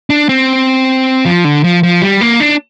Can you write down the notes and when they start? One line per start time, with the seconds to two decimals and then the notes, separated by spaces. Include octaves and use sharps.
0.10 D4
0.29 C4
1.25 F3
1.44 D3
1.64 F3
1.83 F3
2.02 G3
2.21 A#3
2.40 D4